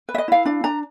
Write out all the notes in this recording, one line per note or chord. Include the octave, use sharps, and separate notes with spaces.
B4
E5
D#5
E4 F5
D4 F5
D4 A#5